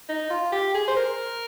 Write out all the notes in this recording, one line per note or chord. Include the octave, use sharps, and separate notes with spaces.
D#4
F4
G4
G#4
C5
A#4